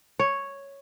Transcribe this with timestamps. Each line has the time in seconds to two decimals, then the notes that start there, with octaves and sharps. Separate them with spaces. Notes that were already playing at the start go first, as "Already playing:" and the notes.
0.19 C#5